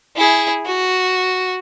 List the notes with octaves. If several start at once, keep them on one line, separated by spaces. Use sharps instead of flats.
E4 G#4
F#4